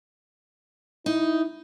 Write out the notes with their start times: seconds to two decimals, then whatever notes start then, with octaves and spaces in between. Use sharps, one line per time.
1.06 D#4 E4